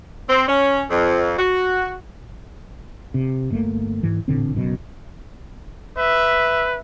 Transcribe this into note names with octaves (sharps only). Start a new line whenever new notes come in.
C4
C#4
F2
F#4
C3
G1 A3 A#3
G#2 E3
A1 A#2 D3 C4
F#1 F#2 B2
B4 E5